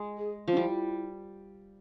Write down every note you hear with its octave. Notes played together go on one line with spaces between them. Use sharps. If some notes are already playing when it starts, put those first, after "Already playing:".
Already playing: G#3
G#4
F3 C#4
G3 E4